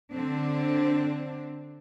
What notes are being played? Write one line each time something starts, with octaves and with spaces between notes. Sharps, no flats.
D3 C4 D4